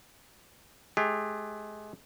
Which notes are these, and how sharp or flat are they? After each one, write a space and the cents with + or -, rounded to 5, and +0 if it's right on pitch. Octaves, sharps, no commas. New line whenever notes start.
G#3 +40 G4 +40